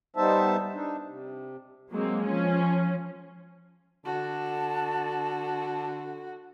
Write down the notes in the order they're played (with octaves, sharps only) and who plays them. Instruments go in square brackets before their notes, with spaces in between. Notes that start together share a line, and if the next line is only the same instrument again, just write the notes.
[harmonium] G3 B3 D#4 C5 E5 A5
D4 D#4
C3
[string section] F#3 G#3 A#3 C4
F3 C#4
[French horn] D3 [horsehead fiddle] F#4 [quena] A5